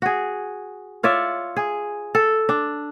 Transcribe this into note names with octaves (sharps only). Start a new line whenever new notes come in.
F#4 G#4
F4 C#5 D5 E5
G#4
A4
D4